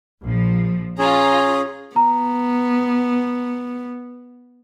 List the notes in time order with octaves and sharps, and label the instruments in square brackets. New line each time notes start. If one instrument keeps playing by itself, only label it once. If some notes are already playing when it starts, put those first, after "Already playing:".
[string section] A#1 F3
[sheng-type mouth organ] C#4 G#4 [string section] F4 A#5
[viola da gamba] B3 [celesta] A#5